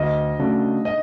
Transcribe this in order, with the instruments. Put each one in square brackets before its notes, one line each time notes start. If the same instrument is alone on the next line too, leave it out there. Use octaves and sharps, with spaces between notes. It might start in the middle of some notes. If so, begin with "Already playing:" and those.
Already playing: [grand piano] D2 [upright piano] D#5
[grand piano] C#3 F#3 A3 D4
[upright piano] D#5